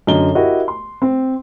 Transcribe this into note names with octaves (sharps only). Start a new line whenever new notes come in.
F#2 D3 D#5 G7
E4 F#4 G4 A#4 D#5
C6
C4